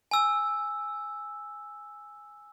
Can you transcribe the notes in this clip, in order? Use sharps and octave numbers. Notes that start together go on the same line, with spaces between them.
G#5 E6